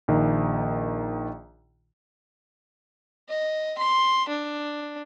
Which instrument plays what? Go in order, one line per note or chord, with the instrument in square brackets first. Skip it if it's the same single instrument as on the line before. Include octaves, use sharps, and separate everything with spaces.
[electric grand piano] A#1 D#3
[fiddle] D#5
C6
D4